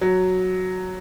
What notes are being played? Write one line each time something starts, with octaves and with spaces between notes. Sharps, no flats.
F#3